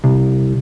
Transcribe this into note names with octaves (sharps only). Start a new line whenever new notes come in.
C2